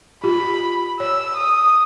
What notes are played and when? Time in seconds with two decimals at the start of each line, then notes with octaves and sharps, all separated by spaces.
0.24 F4 G4 B5
1.00 C#5 E6
1.37 D#6